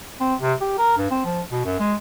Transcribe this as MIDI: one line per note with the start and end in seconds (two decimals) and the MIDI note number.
0.20 0.35 60
0.41 0.53 48
0.61 0.73 67
0.78 0.95 70
0.97 1.08 43
1.11 1.22 60
1.25 1.41 53
1.51 1.60 47
1.65 1.79 42
1.79 1.95 56